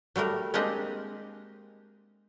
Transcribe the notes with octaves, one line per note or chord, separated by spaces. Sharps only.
F#3 G3 A3 A#4
G#3 A#3 C4 D4 G4 D#5